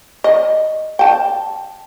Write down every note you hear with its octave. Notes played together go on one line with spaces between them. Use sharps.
D#5
G5 A5